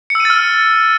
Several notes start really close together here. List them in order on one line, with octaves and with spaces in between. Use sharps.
C#7 E6 D#7 A6 F6